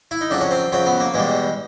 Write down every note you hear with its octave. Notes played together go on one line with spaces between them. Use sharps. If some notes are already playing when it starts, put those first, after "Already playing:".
E4
D#4
F2 C#3 F#3 D4
C#4
C4
F2 C#3 F#3 C4
B3
A#3
E2 B2 G3 G#3